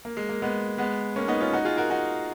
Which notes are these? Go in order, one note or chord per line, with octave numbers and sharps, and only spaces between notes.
A#3
G#3
A#3
G#3 B3
G#3 B3
A#3 C#4
B3 D#4
C#4 F4
D#4 F#4
F4 G#4
F#4 A#4
D#4 F#4